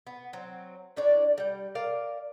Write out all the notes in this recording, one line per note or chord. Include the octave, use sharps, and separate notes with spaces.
B3
F#3 C4
A2 D4 C#5 D5
G3 G5
A#4 D5 F5